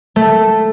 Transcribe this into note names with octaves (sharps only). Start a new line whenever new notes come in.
A3